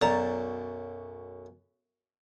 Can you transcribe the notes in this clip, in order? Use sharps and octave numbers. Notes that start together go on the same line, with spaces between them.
B1 F#2 D5 A5 A#5 A6